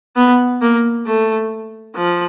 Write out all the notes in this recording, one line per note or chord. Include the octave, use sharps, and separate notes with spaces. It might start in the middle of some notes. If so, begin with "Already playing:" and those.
B3
A#3
A3
F3